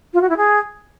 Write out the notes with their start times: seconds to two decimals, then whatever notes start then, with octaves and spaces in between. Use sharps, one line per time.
0.14 F4
0.21 F#4
0.29 E4
0.37 G#4